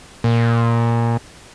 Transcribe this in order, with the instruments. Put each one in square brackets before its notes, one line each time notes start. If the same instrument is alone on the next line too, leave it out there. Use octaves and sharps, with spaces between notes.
[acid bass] A#2